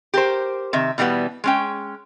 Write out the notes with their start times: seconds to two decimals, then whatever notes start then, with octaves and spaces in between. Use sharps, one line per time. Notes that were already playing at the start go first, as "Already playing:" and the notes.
0.14 G4 A#4 C5
0.73 C3 D#3 E5
0.98 B2 E3 G3 A3 B3
1.44 G#3 C#4 G5